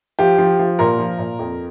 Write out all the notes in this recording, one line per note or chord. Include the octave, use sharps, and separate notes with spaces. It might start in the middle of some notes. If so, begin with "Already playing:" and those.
F3 G4
F3
F3
A#2 A#4
F3
A#2
F2